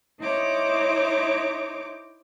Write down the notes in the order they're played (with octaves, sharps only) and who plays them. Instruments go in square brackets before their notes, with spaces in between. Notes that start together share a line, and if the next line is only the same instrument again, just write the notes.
[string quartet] D#4 E4 C5 C#5 D6